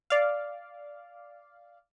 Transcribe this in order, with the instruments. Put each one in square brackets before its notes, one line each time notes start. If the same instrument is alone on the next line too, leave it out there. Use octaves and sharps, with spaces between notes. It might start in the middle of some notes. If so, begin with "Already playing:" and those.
[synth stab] D5 F5